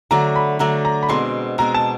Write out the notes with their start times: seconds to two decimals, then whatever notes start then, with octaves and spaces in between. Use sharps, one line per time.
0.11 D3 F#3 A3 D4 A#5
0.36 B5
0.59 D3 F#3 A3 D4 A#5
0.85 A#5
1.03 B5
1.09 B2 G#3 C4 C6
1.58 B2 G#3 C4 A#5
1.74 A5